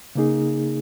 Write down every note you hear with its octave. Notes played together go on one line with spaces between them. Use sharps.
C#3 A#3 D#4 G#4